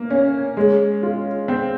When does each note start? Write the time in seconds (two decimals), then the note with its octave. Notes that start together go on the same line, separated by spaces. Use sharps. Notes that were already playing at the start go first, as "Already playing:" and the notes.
Already playing: A#3
0.10 C#4
0.57 G#3
1.03 F4
1.48 C4